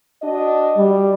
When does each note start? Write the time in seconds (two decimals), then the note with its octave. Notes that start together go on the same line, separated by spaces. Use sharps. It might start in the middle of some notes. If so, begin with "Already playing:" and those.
0.22 D4 F#4 D#5
0.77 G3